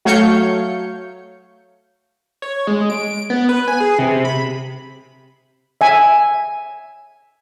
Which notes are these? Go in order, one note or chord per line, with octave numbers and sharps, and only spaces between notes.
F#3 A3 C#5 F5 G6 C#7
C#5
G#3
D7
B3
B4
G#5
G#4
C3
B5
E5 G#5